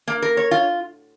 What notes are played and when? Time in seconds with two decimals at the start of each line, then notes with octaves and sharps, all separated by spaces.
0.08 A#3
0.22 A#4
0.37 C#5
0.51 F4